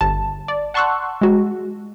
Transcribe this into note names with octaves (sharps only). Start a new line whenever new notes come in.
G1 A5
D5
F#5 A5 C6 C#6 E6 F#6
G#3 F#4